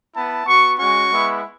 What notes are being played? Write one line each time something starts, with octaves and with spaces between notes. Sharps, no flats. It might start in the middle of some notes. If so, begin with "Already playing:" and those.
B3 E4 A5
B3 F#4 C#6
G#3 C#4 F#4 C#6
G#3 B3 E4